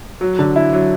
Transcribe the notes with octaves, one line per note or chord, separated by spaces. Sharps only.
F#3
D3
E4
F#3